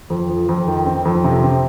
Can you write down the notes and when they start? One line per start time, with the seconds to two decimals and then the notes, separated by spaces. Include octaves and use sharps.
0.10 F2
0.30 F3
0.49 F2
0.68 D#3
0.86 C4
1.05 F2
1.24 C3
1.43 C4